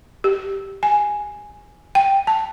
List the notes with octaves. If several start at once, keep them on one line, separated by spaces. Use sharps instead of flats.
G4
G#5
G5
A5